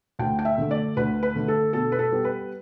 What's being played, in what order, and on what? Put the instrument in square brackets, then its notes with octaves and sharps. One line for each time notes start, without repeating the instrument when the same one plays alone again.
[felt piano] D2 G5
G5
E5
D3 A3
D5
D2 B4
B4
D3 A3
A4
B2 A4
B4
A4
G3 B3
B4